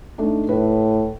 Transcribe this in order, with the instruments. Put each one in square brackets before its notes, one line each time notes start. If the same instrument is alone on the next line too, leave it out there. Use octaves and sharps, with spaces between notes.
[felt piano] A3 D4 D#4
[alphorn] A2 [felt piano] B4